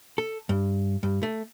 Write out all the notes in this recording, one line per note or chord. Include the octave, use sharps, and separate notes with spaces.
A4
G2
G2
A3